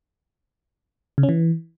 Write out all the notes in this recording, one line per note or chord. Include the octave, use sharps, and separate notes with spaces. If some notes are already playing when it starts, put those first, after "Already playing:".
C#3
C#4
E3